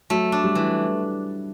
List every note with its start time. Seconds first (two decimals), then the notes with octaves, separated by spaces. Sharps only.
0.10 F#3 A3
0.32 D4
0.44 G3
0.55 E3